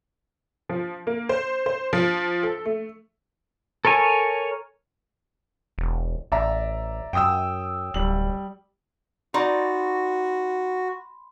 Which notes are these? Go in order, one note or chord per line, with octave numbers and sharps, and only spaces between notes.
F3
A#3
C5
C5
F3
A4
A3
A4 A#4 C#5 G#5
E1
A1 D5 E5 A#5
F#2 G5 D#6 E6
D1 G3 F#7
D#4 F#4 D5 B5 C6